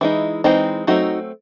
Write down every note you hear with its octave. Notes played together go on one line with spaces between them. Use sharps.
E3 G#3 D#4 E4
E3 G#3 C4 D#4
F#3 A3 C4 D#4 F#4